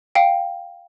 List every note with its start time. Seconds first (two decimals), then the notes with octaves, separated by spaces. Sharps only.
0.15 F5 G5